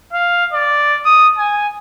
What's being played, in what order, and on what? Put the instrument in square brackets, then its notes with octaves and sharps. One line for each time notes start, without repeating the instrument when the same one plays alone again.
[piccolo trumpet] F5
D5
D#6
G#5